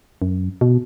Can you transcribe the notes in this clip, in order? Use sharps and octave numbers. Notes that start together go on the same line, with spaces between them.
F#2
B2